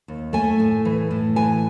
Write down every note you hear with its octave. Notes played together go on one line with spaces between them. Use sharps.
D#2
A3 G#5
A2
E3
A2
E3 G#5